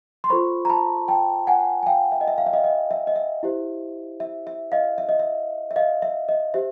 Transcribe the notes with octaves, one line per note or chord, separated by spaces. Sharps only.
C6
F4 A4 C5 B5 C#6
A#5
A5 B5
G5 A5
F#5 G#5
G#5
F5 G5
E5
D#5
E5
F5
E5
D#5 F5
D#5
E5
D#5
E5
E4 G4 C5
E5
E5
D#5 F5
E5
D#5
E5
E5
D#5 F5
E5
D#5
G4 C5 E5